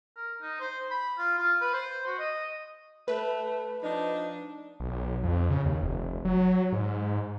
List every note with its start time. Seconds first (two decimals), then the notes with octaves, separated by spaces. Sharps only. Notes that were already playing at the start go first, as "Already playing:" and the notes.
0.16 A#4
0.42 D#4
0.60 C5
0.91 B5
1.18 F4
1.38 F4
1.61 B4
1.73 C5
2.06 F#4
2.19 D#5
3.08 A3 B4
3.83 F3 D4 D#4
4.80 B1
5.23 F2
5.50 C#3
5.66 D#2
5.83 F1
6.25 F#3
6.72 G#2